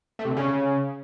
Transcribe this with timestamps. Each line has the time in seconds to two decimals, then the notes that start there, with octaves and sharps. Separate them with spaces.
0.19 A3
0.25 C3
0.31 D3
0.37 C#3